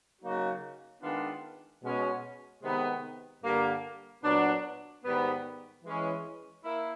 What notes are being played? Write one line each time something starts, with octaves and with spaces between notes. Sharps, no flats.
C#3 F#3 A#3 D#4 F#4
D#3 G#3 B3 D4 F4
B2 G#3 C#4
C3 D#3 G#3 B3
G2 D3 G3 A#3
A#2 F#3 B3 D4
G#2 D#3 G3 B3
E3 G#3 C#4
A#3 E4